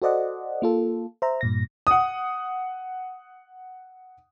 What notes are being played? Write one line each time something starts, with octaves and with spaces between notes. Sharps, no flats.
F#4 A4 C5 D5 D#5 F#5
A#3 F4 A4
C5 E5 A#5
G2 A#2 A#6
F#5 D#6